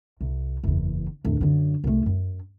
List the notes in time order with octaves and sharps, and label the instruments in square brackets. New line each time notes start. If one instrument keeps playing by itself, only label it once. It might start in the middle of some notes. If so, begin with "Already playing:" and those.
[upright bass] C2
F#1 E2
D1 E2
F#2 D3
C2 A3
F#2